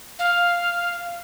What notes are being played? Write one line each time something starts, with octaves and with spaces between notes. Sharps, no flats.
F5